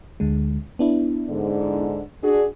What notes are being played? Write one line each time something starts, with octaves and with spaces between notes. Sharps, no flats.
D2 D3 G#3
B3 D4 E4
G#2 D3
D4 F#4 G#4